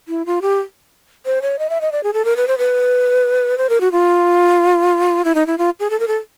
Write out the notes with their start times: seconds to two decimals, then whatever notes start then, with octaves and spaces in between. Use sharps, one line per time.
0.08 E4
0.26 F4
0.42 G4
1.26 C5
1.42 C#5
1.59 D#5
1.70 E5
1.81 D#5
1.92 D5
2.03 G#4
2.14 A4
2.25 A#4
2.37 B4
2.48 C5
2.58 B4
3.58 C5
3.69 A#4
3.81 F#4
3.92 F4
5.25 E4
5.35 D#4
5.47 E4
5.58 F4
5.80 G#4
5.90 A4
6.00 A#4
6.08 A4